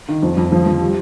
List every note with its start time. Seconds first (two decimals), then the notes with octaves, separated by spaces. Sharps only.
0.08 D#3
0.22 F2
0.37 F2
0.52 F3
0.66 F3
0.81 G3